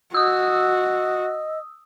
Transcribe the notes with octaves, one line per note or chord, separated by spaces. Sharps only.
F#4 D#5 D#6 E6